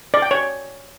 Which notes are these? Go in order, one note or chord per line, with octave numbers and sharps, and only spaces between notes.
D5
G5
C#5